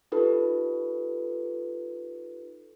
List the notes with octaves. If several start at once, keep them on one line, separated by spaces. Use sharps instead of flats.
D#4 F4 G4 A4 B4